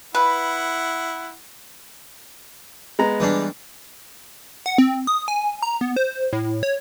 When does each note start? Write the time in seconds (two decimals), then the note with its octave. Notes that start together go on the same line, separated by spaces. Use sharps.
0.15 E4 B4 F#5
2.99 G#3 B3 A#5
3.20 E3 G3 D4
4.66 F#5
4.78 C4
5.07 D#6
5.28 G#5
5.62 A#5
5.81 B3
5.96 C5
6.33 A2
6.63 C#5